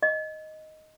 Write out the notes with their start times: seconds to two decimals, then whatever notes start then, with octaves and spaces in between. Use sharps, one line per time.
0.02 D#5